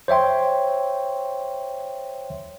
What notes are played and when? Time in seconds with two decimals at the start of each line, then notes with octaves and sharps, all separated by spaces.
0.08 C5 C#5 E5 G5 C6